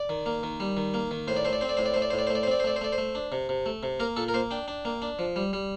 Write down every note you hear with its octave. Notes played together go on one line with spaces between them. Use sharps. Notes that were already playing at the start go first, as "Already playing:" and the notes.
Already playing: D5
D#3
A#3
D#3
G3
D#3
A#3
D#3
A2 C5
D5
A3 C5
D5
C4 C5
D5
A2 C5
D5
A3 C5
D5
A2 C5
D5
C5
A3
D5
C5
C4 D5
C5
A3 D5
C5
A3 D5
C5
A3
D4
C3
C3
A3
C3
A#3 A#4
A#2 A4
A#4
A#3 C5
D4 G5
D4
A#3
D4
F3
G3
G3